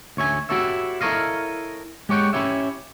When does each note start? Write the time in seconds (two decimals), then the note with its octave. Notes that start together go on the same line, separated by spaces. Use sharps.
0.17 D2 C#5 E5 G#5
0.49 E4 F#4 G4 A4 C#5 E5
1.01 E4 A4 A#4 C#5 D#5 F5
2.09 G#3 G4 C#5 F#5 G5
2.33 C#4 E4 F#4 G4 C#5 E5